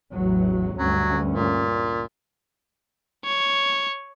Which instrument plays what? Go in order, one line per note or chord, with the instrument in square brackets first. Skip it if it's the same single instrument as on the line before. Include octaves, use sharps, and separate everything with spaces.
[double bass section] A1 E2 F#3
[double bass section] D2 G2 C#4 [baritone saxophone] F#3
[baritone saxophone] A#2
[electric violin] C#5